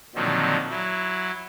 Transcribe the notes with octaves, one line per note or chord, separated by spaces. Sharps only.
A#2 D3 D#3 F3 F#3 C4
F#3 E4